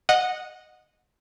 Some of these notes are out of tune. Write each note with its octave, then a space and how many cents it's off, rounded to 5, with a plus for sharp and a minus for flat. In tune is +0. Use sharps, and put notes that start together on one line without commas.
D#5 -10 F#5 -15